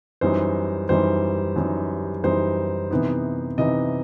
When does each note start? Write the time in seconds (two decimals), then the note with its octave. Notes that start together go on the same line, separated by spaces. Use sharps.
0.21 F#2 E3 G3 D#4 C5
0.89 F#2 E3 G3 D#4 C5
1.56 F#2 E3 G3 D#4
2.23 F#2 E3 G3 D#4 C5
2.91 C3 E3 B3 D#4
3.58 C3 E3 B3 D#4 D#5